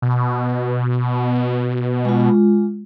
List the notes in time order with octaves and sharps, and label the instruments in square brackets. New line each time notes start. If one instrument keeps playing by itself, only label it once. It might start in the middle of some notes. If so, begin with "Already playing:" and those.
[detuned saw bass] B2
[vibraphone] G#3 F4